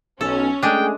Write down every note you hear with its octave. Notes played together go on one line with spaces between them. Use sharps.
B1 C#4 A4
G#3 A3 D4 G#4 G5